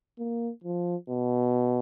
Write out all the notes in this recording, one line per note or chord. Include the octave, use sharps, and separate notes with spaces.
A#3
F3
B2